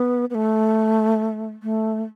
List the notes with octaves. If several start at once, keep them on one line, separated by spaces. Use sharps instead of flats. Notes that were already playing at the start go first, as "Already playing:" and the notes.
Already playing: B3
B3
A3
A3